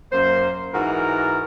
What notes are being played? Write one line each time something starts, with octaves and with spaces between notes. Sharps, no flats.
F#2 A#3 C5
G#2 E3 F#4 A#4